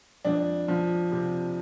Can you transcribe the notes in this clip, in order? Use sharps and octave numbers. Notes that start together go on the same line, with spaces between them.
F2 D4
F3
C3